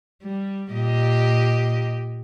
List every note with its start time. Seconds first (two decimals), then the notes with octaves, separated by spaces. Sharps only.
0.23 G3
0.73 A#2 G4 D#5